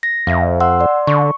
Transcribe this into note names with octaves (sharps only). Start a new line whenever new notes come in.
A#6
F2 E5 F5
F#5 C6 E6
D5 C6
D3 C#6